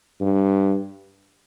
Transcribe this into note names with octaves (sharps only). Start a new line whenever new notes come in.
G2